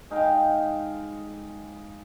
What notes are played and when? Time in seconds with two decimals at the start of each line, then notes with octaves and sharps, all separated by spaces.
0.11 G#3 D#4 F5 G5